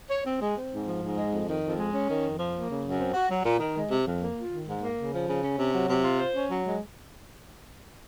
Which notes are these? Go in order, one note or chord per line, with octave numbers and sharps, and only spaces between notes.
C#5
C4
G#3
C4
G#2
F3
G#2
G#3
F2
D#3
F2
G#3
C#4
D#3
F2
F3
A#3
C#3
F#2
C4
F#4
F#3
A#2
D#3
G#3
C3
F2
A#3
F4
D#3
G#2
A#3
C#3
F3
C#3
C#4
C3
F#3
C3
F4
C5
C#4
F#3
G#3